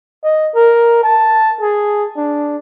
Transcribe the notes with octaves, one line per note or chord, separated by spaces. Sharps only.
D#5
A#4
A5
G#4
D4